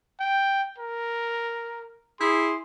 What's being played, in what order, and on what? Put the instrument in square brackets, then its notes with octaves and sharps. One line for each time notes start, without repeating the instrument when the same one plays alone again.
[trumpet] G5
A#4
[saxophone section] E4 G#4 [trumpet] C6